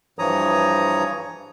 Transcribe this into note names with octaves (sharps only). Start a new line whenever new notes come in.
G2 E3 F3 C#5 A#5 D#6